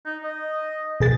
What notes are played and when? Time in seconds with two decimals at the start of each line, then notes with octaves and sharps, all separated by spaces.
0.06 D#4
0.23 D#5
1.00 B2 G#4 A6